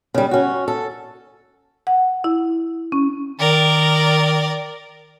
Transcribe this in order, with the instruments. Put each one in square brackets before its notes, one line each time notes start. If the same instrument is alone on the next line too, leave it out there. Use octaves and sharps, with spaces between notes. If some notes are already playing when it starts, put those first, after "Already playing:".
[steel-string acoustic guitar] C#3 G3
C#4 F#4
A4
[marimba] F#5
E4
C#4
[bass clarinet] D#3 [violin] A#4 D5